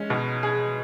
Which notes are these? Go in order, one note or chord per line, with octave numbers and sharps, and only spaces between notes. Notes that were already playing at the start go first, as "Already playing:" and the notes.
Already playing: G#3 C#4
B2
G#4